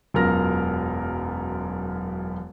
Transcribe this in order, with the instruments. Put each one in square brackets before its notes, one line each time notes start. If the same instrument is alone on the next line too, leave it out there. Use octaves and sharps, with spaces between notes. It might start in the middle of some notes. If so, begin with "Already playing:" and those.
[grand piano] E1 F#2 F4 A#4 F6 A#6